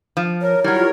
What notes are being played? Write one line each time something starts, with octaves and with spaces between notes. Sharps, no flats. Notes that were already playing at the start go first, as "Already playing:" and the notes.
F3
A#4 C#5
F#3 G3 E4 A#4 C#5
F4 G4